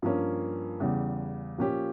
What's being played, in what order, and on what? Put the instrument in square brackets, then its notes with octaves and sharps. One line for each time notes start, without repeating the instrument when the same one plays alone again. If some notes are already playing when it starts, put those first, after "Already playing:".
[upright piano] G2 F3 A#3 C#4
E2 C#3 G3
A#2 F3 C#4 G4